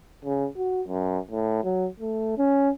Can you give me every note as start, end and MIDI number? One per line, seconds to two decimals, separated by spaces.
0.25 0.47 49
0.57 0.82 66
0.87 1.18 42
1.31 1.64 45
1.64 1.87 54
2.00 2.35 57
2.38 2.69 61